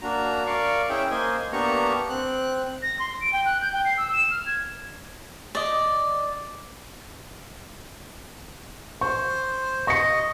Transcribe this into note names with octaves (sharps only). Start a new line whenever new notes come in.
A#3 D4 F#4 A#5
A#4 D5 F5 C#6
C#4 E4 G#4 E5 G5
A#3 C5 D#5 G#5
A#3 B3 D4 G4 A#5 C#6
C4 F#6
A#6
C6
D7
G5
F#6
G6
G5
C7
E6
E7
F6
G#6
D5 D#5
C5 C#6
D#5 C#6 C#7